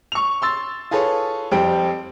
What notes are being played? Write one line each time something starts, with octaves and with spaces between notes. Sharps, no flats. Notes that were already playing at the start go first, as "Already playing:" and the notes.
C#6 F7
C6 E6 A6
F4 G#4 A4 B4 C#5
F2 G3 C4 G4 D7